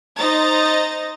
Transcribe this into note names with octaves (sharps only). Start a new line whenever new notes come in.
D#4 C5 D#5 A#5 A6